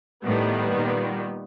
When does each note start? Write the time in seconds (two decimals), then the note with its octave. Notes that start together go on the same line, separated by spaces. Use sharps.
0.24 A2 D#3 G3 B3
0.73 A#2